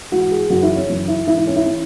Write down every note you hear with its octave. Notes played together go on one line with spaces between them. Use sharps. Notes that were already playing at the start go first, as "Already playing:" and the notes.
G#2 E3 F#4
G#4
F#2 C#3 E3 F#4
E4
C#4
F#2 C#3 E3
E4
G#2 E3 E4
E4
C#4
E4
E3 C#4